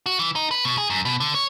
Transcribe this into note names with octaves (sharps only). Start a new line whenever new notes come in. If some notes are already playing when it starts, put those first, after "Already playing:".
F#4
E3
D#4
B4
B2
G#4
F#2
B2
D3
C#5